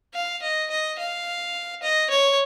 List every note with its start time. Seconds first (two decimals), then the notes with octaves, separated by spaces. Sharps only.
0.14 F5
0.42 D#5
0.70 D#5
0.98 F5
1.83 D#5
2.10 C#5